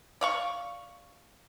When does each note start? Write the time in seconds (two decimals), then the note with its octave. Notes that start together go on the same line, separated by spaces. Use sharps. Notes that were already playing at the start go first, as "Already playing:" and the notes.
0.21 D5 F5 C#6